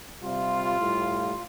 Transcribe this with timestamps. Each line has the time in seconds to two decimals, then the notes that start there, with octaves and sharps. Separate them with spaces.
0.22 C3 G3 F4
0.79 A2 G3